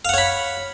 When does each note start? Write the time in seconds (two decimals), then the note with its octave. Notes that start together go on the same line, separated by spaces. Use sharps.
0.05 F5
0.09 F#5
0.14 C#5
0.18 B5